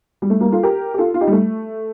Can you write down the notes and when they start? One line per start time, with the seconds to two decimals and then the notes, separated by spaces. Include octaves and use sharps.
0.22 G3
0.30 A3
0.40 G3 A#3
0.52 F4 A4
0.63 G4 A#4
0.94 G4
0.98 F4 A4
1.14 F4
1.21 D#4 G4
1.27 G3
1.32 A3